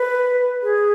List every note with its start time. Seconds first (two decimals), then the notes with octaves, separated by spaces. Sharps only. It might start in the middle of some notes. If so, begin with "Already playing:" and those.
Already playing: B4
0.63 G#4